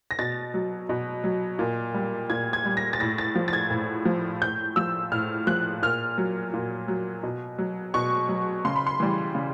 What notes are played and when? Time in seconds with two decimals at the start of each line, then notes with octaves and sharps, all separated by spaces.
0.11 A#6
0.19 B2 A6
0.54 F#3
0.89 B2
1.24 F#3
1.59 A#2
1.94 G3
2.30 A#2 G#6
2.53 G#6
2.66 G3
2.77 A#6
2.93 A6
3.00 A2 A#6
3.18 A6
3.36 F3
3.48 A6
3.53 G#6
3.70 A2
4.05 F3
4.42 A2 G6
4.76 F3 E6
5.12 A2 F6
5.47 F3 F#6
5.82 A#2 F6
6.18 F#3
6.54 A#2
6.88 F#3
7.23 B2
7.58 F#3
7.94 B2 C#6
8.29 F#3
8.65 C#3 C6
8.76 B5
8.87 C6
9.00 E3 G3
9.35 C#3